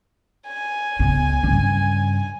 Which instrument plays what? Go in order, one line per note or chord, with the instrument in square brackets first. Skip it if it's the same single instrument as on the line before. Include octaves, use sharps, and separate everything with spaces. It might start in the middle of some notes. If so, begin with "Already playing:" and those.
[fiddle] G#5
[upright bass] C#2 B3
G2 C#3